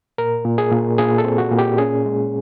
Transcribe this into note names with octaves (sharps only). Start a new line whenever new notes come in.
A#2 A#4
A#2
G#4
A#2
A#2 G#4
A4
C4
F#4
A#2
G4
C#4 G#4
G#3